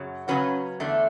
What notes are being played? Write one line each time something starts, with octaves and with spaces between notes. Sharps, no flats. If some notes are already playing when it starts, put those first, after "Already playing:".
Already playing: F#2 C#3 F#3
C#3 F#3 C#4 F#4 B4
E2 D3 A3 D4